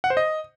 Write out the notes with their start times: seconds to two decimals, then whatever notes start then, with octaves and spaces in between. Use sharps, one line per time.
0.04 F#5
0.10 C5
0.17 D#5